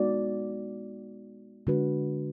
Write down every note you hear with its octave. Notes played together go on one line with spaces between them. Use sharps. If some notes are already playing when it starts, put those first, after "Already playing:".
Already playing: G#3 B3 D#4 F#4 D5
D3 G#3 D4 F#4 B4